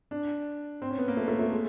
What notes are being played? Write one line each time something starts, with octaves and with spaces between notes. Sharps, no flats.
D4
C4
C#4
B3
A#3
A3
A3
A3
G#3